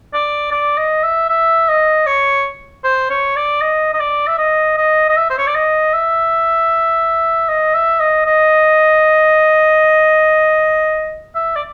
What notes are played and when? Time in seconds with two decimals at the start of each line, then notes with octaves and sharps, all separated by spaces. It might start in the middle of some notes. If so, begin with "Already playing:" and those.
0.14 D5
0.51 D5
0.78 D#5
1.04 E5
1.30 E5
1.69 D#5
2.07 C#5
2.84 C5
3.10 C#5
3.36 D5
3.62 D#5
3.93 D#5
4.00 D5
4.28 E5
4.39 D#5
4.78 D#5
5.09 D#5
5.17 E5
5.30 C5
5.38 C#5
5.47 D5
5.55 D#5
5.94 E5
7.49 D#5
7.75 E5
8.00 D#5
8.26 D#5
11.35 E5
11.56 D5